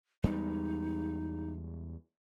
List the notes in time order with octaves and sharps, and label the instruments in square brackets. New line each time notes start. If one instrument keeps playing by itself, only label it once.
[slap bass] E2 G3 G#3 [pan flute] D#4